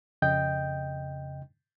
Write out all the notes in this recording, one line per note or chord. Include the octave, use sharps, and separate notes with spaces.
F2 C#3 D#5 G5 G6